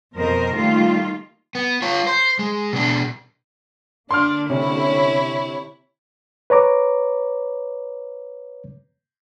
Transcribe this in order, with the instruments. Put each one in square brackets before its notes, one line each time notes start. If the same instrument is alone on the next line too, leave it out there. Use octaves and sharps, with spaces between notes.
[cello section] F2 B2 A#4 C5 D#5
D#3 G3 A3 A#3 F4
[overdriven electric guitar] B3
F4 C#5
C5
G#3
B2 D4
[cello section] D3 A#3 [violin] D4 [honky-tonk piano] C6 F6
[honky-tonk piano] C3 [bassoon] C#4 [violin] E4 C#5
[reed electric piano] B4 C#5 A#5 D6